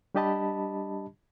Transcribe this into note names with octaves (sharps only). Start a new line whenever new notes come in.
G3 D4 G4 D#5 A5 B5